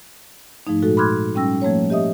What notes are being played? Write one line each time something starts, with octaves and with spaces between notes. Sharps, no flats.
G#2 F3 A3 D#4
A#2 G#3 F#4 A4
B5 C6 D6 F6 F#6 G#6
G3 C#4 G5 E6 A#6
F3 A3 A#3 C#5
G4 D#5 E5 D#6